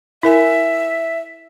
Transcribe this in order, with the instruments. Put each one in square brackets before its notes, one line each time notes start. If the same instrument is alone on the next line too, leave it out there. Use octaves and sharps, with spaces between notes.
[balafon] E4 A#4 G#5 [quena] E5